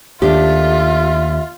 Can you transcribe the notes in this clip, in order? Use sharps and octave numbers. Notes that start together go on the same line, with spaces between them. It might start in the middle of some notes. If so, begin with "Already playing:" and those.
D#2 A3 D4 F4 G4 E5